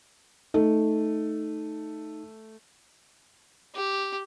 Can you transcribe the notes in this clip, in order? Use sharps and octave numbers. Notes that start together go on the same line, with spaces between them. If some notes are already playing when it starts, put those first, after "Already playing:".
A3 D#4
G4